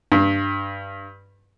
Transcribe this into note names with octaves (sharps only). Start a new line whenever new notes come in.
G2